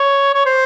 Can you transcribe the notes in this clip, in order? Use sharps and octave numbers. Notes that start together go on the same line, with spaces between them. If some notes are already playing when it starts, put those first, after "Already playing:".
Already playing: C#5
C#5
C5